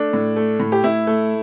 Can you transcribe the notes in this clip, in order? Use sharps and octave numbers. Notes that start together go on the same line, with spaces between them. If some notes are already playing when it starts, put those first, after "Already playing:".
Already playing: A3 D4
A2
A3
A2
G4
A2 E4
A3